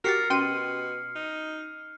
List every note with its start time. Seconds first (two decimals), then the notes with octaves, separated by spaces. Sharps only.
0.04 F#4 G4 A#4 F6 A6 C7 C#7
0.30 B2 C#4 G5 C6 D#7
1.16 D#4